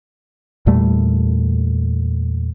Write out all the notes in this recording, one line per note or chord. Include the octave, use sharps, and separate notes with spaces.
E2 A#2 G3 A3